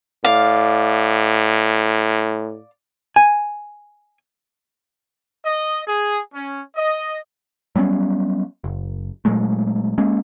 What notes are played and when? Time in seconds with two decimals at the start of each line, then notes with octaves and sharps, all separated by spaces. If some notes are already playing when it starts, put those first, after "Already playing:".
0.24 A2 D5 F5
3.16 G#5
5.45 D#5
5.87 G#4
6.34 C#4
6.76 D#5
7.76 F#3 G3 B3 C#4
8.64 F#1
9.25 A#2 F#3 G#3 A3
9.98 G#3 A#3 C#4